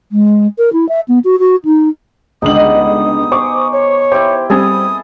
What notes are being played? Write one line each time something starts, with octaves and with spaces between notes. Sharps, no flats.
G#3
A#4
E4
E5
B3
F#4
F#4
D#4
C#2 B2 D3 G3 D#4 D#6 F#7
G#4 C5 C#6 D6
C#5
E4 G4 C5
G3 C4 G#4 A4 G#5 D#6